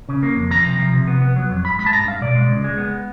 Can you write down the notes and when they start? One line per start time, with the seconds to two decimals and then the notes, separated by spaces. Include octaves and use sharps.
0.09 C#3
0.23 A#3
0.36 F2
0.51 F3 A#5
0.65 C3
0.79 F3
0.93 C3
1.07 B3
1.22 B3
1.36 F#3
1.50 F2
1.64 G2 B5
1.79 G#3 B5
1.86 A5
1.93 G2 A#5
2.07 G2 F5
2.21 B2 D5
2.35 G#3
2.50 C#2
2.64 G#3
2.78 B3